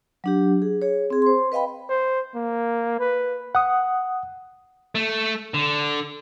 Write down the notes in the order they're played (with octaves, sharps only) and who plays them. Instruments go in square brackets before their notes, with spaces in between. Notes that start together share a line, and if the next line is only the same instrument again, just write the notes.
[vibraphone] F#3 D4 G4
G#4
G#4 C#5
C4 G#4
C5 C6
B4 D#5 F5 G5 B5
[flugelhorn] C5
A#3
B4
[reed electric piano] F#5 D#6
[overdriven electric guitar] A3
D3